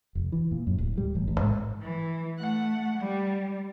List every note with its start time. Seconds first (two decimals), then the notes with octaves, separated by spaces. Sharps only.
0.15 F1
0.32 E3
0.52 A#2
0.67 F#2
0.78 D1
0.98 G3
1.15 A1
1.28 A1
1.40 G#2
1.82 E3
2.38 A3 F#5
2.98 G3